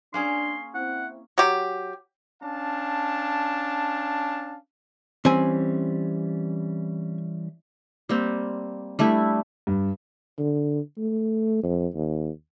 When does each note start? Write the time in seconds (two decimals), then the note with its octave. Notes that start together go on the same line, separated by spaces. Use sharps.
0.14 A#3 C#4 D4 G#4 C6
0.75 C4 E4 F#5
1.38 F#3 G4
2.41 C#4 D4 F5 A5
5.25 E3 G3 C4 C#4 G#5
8.09 G3 A#3 C4
8.99 G3 A3 D4 E4
9.67 G2
10.38 D3
10.98 A3
11.63 F2
11.94 D#2